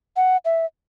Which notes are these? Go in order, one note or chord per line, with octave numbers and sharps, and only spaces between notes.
F#5
E5